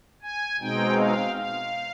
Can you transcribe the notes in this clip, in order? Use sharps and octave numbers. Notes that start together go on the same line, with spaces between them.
G#5
B2 G#3 C4 D#4 G5
F5
F5